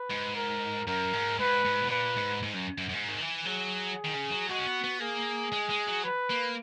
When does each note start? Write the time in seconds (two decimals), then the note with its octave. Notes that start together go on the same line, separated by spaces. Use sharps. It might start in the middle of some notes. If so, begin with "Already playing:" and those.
Already playing: B4
0.10 G#2
0.35 A#4
0.87 F#2 A#4
1.13 G#2
1.39 G#2 B4
1.65 G#2
1.81 B2
1.90 A#2 B4
2.17 G#2
2.43 G#2
2.54 F#2
2.78 F#2
2.89 F#2
2.94 G#2
3.08 D#3
3.20 E3
3.45 F#3 G#4
4.05 D#3
4.14 C#3
4.31 F#3
4.49 G#3 F#4
4.59 C#4
4.67 B3
4.84 B3
5.00 A#3 G#4
5.52 G#3
5.70 G#3
5.87 F#3
6.04 B4
6.30 A#3